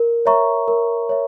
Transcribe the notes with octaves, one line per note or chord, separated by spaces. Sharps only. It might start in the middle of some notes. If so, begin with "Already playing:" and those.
Already playing: A#4
C#5 E5 A#5 C#6
A#4
C#5 E5